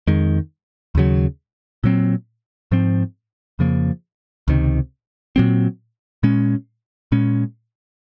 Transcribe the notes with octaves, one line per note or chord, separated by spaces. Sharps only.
F2 D#3 G#3
D#2 C#3 F#3
A#2 F#3 C4
G#2 F3 C4
F2 C#3 F3 A#3
C#2 C3 D#3
A#2 F#3 C4
A#2 G#3 C#4
A#2 G#3 C#4